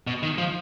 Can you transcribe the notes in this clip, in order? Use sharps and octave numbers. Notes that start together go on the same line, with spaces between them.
B2
D#3
F3